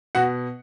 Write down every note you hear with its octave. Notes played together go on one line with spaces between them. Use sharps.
B2 F#4 F#5